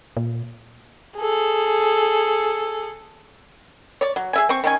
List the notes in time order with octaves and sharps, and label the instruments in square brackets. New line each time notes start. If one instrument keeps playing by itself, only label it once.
[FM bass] A#2
[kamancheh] G#4 A4
[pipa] C#5 D5
F#3
G#4 E5 G#5
C4 C5 C#6
D#3 C#4 G#5